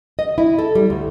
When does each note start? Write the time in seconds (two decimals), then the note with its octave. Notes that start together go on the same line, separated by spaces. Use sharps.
0.19 D#5
0.38 E4
0.59 A4
0.75 G3
0.90 D2